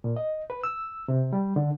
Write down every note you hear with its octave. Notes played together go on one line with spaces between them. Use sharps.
A#2
D#5
B4
E6
C3
G3
D3